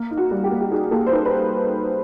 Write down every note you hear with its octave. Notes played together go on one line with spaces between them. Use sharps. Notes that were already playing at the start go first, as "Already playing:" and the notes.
Already playing: A#3
D#4
F#4
G3
G4
A#3
G4
D#4 G#4
A#3 A4
C5
D#4 B4
B4